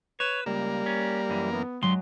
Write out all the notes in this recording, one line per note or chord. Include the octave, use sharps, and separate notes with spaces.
B4 C#5 E7
C#2 G3 A#3
C#4
F#2 E3
B3
G2 F#3 G#3 C6